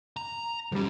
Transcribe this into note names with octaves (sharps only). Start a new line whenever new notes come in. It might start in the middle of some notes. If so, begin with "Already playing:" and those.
A#5
B1 F3 G3 C#4